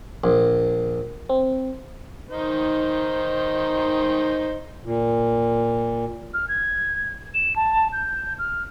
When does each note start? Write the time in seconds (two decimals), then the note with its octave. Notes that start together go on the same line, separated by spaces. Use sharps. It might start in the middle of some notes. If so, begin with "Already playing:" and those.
0.24 A#1
1.29 C4
2.30 D#3 D#4 C5
4.83 A#2
6.34 F6
6.48 G#6
7.34 E7
7.56 A5
7.92 G6
8.39 F6